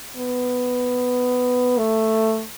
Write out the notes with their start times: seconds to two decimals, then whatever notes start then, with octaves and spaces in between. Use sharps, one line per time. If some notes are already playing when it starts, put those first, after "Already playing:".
0.17 B3
1.77 A3